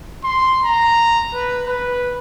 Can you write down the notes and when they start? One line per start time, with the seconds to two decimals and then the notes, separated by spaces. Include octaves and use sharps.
0.24 C6
0.64 A#5
1.34 B4
1.67 B4